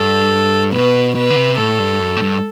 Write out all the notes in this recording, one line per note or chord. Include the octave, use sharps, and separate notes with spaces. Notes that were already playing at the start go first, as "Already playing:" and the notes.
Already playing: G2 A4
B2 B4
B2 B4
D3
C3
A2 A4
G2
F#2
A2
G2